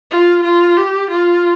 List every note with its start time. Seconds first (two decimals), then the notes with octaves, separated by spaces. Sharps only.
0.10 F4
0.44 F4
0.77 G4
1.11 F4